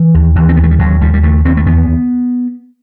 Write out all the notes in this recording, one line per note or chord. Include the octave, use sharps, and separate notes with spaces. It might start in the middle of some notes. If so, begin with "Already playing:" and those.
Already playing: E3
D#2
D#2 E3
C4
D#2 B3
A3
G3
D#2 F#3
D#2 G3
G3
D#2 A3
D#2 C4
A3
E2 B3